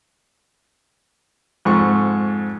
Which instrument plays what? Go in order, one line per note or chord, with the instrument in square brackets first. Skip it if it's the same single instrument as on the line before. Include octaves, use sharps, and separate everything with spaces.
[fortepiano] F2 G#2 C#6